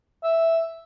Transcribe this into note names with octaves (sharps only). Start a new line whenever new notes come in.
E5